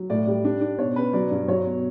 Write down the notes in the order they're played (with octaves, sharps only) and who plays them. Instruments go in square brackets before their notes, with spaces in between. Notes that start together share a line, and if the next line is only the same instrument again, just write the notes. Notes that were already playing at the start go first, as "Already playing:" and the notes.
Already playing: [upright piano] F#3
A2 D5
G3
D4
D4
B2 C#5
C#4 B4
F#3 D5
G2
F#3 C#5
B2